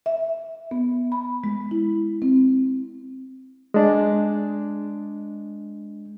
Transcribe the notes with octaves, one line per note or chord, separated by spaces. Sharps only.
E5
B3
B5
G#3
E4
C4
G#3 D4